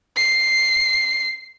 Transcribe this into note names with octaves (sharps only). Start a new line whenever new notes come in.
C7